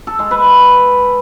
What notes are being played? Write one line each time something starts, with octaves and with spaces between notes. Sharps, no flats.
A4
G#3
B4